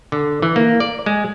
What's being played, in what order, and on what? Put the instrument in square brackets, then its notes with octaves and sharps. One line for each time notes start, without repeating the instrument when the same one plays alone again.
[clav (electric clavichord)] D3
E3
A#3
D5
G#3